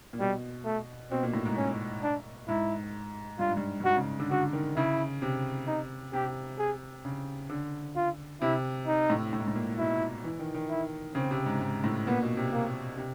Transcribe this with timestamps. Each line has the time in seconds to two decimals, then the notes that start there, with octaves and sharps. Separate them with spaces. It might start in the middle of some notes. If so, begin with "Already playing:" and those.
0.13 A#2
0.20 B2 G3
0.65 A3
1.11 B2 C4
1.23 A#2
1.34 A2
1.45 G#2
1.57 C#4
2.03 D4
2.48 G#2 E4
3.39 G2 F4
3.49 G#2
3.57 G2
3.80 G2
3.85 G#2 F#4
3.96 C#3
4.20 D3
4.31 D3 F#4
4.53 D#3
4.76 C#3 E4
5.22 C3
5.67 D#4
6.13 C3 G4
6.59 G#4
7.05 C#3
7.49 D3
7.96 F4
8.41 C3 E4
8.87 D#4
9.10 A2
9.33 A2
9.40 G#2
9.48 A2
9.55 A#2
9.79 B2 E4
10.24 E3
10.39 D#3
10.54 D#3
10.70 E4
11.15 C#3 C4
11.31 C3
11.46 G#2
11.61 G#2
11.84 A2
12.07 A#2 B3
12.22 B2
12.37 C3
12.52 A#3
12.97 C3